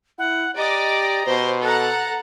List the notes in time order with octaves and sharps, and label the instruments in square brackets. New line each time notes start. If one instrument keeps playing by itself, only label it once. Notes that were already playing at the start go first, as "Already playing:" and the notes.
[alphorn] E4 [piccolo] F#5
[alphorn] G4 [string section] D5 D#5 D6 [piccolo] A#5
[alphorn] B2 [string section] C5
[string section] A4 F#5 A#5 [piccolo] F#6